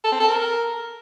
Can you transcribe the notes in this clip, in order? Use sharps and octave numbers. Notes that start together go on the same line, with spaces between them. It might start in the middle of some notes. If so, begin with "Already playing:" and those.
A4
C4
A4
A#4